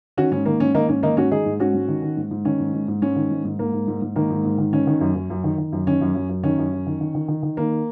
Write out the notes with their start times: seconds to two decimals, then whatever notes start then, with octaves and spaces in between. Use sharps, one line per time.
0.17 D#3 C#4 F#4
0.31 G#2 C#4
0.46 D#3 A#3
0.60 G#2 C#4
0.74 D#3 A#3 D#4
0.89 G#2 C#4
1.03 D#3 A#3 D#4
1.17 G#2 C#4 F#4
1.31 D#3 D#4 G#4
1.46 G#2
1.60 G#2 C#4 F#4
1.74 G#2
1.89 D#3
2.03 D#3
2.17 G#2
2.31 G#2
2.45 D#3 C#4
2.60 G#2
2.73 G#2
2.88 G#2
3.02 G#2 C#4
3.16 D#3
3.31 G#2
3.45 G#2
3.59 G#2 A#3
3.73 G#2
3.88 G#2
4.02 G#2
4.16 D#3 A#3
4.30 G#2
4.45 G#2
4.58 D#3
4.73 D#3 C#4
4.87 D#3
5.01 F#2
5.15 F#2
5.30 F#2
5.44 D#3
5.58 D#3
5.72 F#2
5.87 D#3 C#4
6.01 F#2
6.15 F#2
6.29 F#2
6.44 D#3 C#4
6.58 F#2
6.72 F#2
6.86 D#3
7.01 D#3
7.15 D#3
7.28 D#3
7.43 D#3
7.57 D#3 A#3